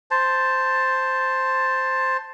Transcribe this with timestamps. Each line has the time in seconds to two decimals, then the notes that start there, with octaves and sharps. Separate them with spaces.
0.11 C5 A5